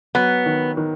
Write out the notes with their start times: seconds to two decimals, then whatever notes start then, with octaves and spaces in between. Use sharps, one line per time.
0.15 F#3 B3
0.46 D#3
0.77 D#3